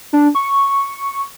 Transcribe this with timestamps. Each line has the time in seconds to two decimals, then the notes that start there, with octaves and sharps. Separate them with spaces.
0.13 D4
0.35 C#6